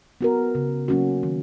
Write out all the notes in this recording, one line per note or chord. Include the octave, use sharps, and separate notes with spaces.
B3 F#4 A#4
C#3
F#3 A#3 C#4 F#4
D#3